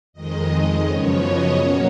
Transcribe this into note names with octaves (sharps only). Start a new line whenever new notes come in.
F2 D#3 G#3 D#5
F#2 C#3 F3 B3 C#5
D#5
B2 F#3 A#3 C#4 C#5